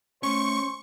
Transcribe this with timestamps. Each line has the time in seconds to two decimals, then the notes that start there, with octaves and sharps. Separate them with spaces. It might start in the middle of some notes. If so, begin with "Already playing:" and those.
0.23 A3 C#4 C5 C#6